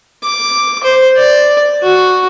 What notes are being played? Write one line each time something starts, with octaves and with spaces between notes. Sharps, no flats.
D6
C5
D5
F#4